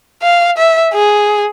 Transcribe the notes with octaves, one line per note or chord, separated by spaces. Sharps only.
F5
E5
G#4